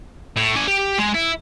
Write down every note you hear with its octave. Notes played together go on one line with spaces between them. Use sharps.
A2
D4 G#5
G4
G#3
E4